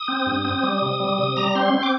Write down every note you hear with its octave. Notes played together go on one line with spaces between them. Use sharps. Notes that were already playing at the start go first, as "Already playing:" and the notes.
Already playing: D#6
C4
G2
C4
G3
C3
G3
C3
G3 A#5
C4 C6
C4 C6
D6